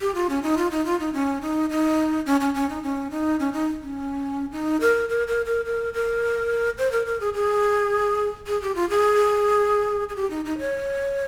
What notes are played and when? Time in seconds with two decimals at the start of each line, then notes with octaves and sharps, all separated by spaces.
0.01 G4
0.15 F4
0.30 C#4
0.43 D#4
0.57 F4
0.71 D#4
0.85 F4
1.00 D#4
1.14 C#4
1.41 D#4
1.70 D#4
2.26 C#4
2.41 C#4
2.54 C#4
2.69 D#4
2.83 C#4
3.11 D#4
3.40 C#4
3.53 D#4
3.82 C#4
4.52 D#4
4.81 A#4
5.09 A#4
5.27 A#4
5.46 A#4
5.65 A#4
5.94 A#4
6.78 C5
6.92 A#4
7.06 A#4
7.20 G#4
7.34 G#4
8.47 G#4
8.62 G4
8.75 F4
8.90 G#4
10.09 G#4
10.16 G4
10.30 D#4
10.45 D#4
10.59 C#5